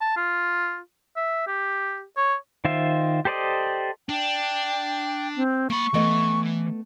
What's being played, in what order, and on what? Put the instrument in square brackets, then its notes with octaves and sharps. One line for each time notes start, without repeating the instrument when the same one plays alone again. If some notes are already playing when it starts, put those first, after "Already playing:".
[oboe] A5
F4
E5
G4
C#5
[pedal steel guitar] D#3 F4 C5 E5
G4 A4 C5 D5 D#5
[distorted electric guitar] D4 [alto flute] G5
[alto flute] C4
[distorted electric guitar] A#3 B5 [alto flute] C#6
[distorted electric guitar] E3 [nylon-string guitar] A3 B3 D#5